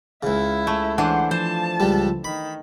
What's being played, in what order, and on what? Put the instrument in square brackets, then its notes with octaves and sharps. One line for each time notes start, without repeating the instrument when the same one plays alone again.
[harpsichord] C#2 C#3 [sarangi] E4
[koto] A3
[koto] E3 D4 [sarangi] C5 [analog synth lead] F#5
[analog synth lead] F3 [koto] C5 [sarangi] A5
[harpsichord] C#2 G3
[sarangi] D#3 [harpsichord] B5